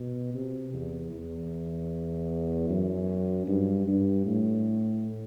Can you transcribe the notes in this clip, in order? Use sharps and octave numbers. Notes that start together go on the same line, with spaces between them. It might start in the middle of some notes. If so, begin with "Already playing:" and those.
Already playing: B2
C3
E2
E2
F#2
G2
G2
A2